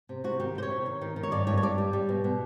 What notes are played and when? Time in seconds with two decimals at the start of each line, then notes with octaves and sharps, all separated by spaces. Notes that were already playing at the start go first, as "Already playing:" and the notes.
0.09 C3
0.24 C3 F#4
0.39 D#3 G4
0.55 C3 C5
0.63 C#5
0.70 C3
0.86 D#3
1.02 D#3
1.16 D#3
1.23 C#5
1.32 G2 D5
1.47 G2 C#5
1.57 C#5
1.62 G2 D5
1.78 G3
1.93 G3
2.09 B2
2.24 B2